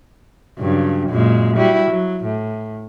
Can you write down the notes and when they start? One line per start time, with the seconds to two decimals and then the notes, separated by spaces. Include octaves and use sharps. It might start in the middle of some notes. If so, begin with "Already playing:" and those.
0.59 G2 C#3 F#3
1.09 F#2 A#2 G#3
1.57 G3 E4 F#4
1.90 F#3
2.24 A2